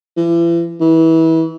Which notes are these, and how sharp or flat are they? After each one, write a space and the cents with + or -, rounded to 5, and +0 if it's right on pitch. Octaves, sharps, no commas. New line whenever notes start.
E3 +40
E3 -25